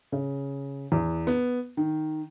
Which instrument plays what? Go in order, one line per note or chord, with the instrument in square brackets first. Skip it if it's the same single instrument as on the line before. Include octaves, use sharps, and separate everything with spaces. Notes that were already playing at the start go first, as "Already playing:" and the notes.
[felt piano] C#3
E2
B3
D#3